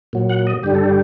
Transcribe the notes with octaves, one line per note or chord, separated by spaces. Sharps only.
A#2 F#3
F#5
D#5
G2 D3 G3 G4
A4
G4